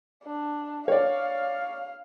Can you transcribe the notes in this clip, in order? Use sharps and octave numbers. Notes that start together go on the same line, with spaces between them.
D4
C#5 D5 F5